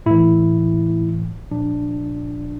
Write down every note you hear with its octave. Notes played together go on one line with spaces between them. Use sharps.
A2 E3 E4
A#2 F3 D4